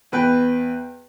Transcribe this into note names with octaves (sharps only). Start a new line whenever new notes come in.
E2 B4 G5